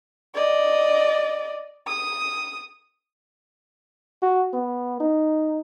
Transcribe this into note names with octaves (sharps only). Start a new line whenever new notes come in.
D5 D#5
D#6
F#4
B3
D#4